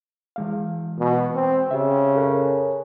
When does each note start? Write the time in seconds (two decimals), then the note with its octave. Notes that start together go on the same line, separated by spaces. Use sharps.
0.36 E3 G#3 F5
0.98 B2
1.35 C4
1.71 C#3 G4 E5
2.16 A4 A#4 C#5